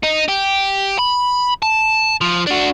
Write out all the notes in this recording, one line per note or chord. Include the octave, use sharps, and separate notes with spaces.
D#4
G4
B5
A5
F3
D4 F#4